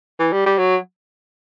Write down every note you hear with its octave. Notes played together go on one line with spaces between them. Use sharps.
E3
G3
G3
F#3